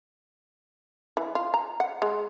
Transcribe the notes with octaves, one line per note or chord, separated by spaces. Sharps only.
E3
F4
A#5
F#5
G#3